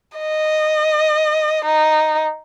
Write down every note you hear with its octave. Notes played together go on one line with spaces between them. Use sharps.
D#5
D#4